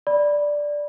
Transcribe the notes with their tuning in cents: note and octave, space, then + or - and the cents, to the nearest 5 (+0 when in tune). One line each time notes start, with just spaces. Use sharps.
D5 +0 B5 -10